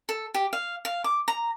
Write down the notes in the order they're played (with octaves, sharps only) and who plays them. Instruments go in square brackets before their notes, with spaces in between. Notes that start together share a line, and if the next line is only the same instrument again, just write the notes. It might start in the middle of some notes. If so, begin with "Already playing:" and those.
[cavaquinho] A4
G4
F5
F5
D6
A#5